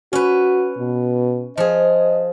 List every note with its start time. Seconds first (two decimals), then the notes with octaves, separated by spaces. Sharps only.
0.13 C#4 F#4 B4
0.78 B2
1.57 F3 G#4 D#5